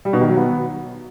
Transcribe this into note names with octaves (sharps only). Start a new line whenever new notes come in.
G3
B2
D#3
F#3
B3